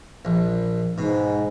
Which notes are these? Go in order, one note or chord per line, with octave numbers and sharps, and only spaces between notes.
A#1
G#2 B2